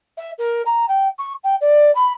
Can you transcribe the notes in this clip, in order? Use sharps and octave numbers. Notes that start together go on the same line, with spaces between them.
E5
A#4
A#5
G5
C#6
G5
D5
B5